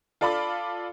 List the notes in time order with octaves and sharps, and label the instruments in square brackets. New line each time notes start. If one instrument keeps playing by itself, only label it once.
[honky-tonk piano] F4 A4 D5 A5 B5 D6